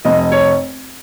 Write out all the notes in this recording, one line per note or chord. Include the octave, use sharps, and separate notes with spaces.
F1 D#5
C#5